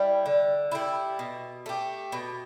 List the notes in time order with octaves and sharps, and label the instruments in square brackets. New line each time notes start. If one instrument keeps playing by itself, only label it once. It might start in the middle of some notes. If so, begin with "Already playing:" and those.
Already playing: [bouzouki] G3 E4
D3
G3 E4
B2
A3 G4
B2